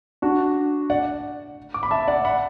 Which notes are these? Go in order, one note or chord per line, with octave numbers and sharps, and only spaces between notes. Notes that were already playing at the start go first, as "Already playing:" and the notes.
D4 F#4
D5 F#5
D6
B5
E5 A5
D5 F#5
F#5 B5